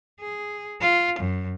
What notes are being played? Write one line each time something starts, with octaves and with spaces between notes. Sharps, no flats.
G#4
F4
F#2